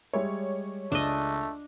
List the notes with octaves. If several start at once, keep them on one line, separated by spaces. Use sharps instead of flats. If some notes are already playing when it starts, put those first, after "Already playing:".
G3 G#3 C#5 E5
C#2 A3 D4 D#5